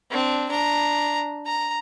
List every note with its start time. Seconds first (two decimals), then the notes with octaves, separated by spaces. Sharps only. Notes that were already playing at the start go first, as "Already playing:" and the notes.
0.11 C4 D4
0.50 D4 A#5
1.46 A#5